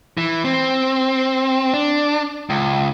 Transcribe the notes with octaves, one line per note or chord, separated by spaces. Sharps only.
E3
C4
D4
C#2